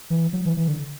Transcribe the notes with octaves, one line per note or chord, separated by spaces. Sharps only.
E3
F#3
E3
E3
D3